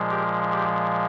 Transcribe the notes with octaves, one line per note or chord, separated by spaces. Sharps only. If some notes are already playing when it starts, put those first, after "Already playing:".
Already playing: A#2 F3 G#3
G4 A#4
G4